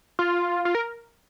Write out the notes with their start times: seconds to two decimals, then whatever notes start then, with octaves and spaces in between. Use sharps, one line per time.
0.19 F4
0.65 F4
0.75 A#4